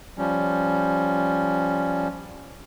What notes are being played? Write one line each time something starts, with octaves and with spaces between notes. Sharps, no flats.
F3 G3 C#4